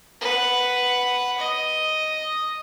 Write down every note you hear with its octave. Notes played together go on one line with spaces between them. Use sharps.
B4 F#5
D#5